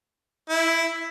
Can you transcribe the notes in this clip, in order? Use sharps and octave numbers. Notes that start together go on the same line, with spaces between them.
E4